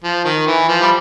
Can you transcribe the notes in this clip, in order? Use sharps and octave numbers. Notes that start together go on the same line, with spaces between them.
F3
D#3
E3
F3
G3